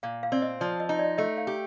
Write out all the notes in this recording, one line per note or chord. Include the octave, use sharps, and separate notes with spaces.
A#2 F5
F5
C4 D5
D#5
F3 D5
D#5
D#4
D5
A3 D#5
F5
G4